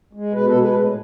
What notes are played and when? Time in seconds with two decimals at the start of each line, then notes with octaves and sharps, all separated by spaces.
0.13 G#3
0.33 B2 B4
0.46 A4
0.53 G#3
0.59 B4
0.73 A2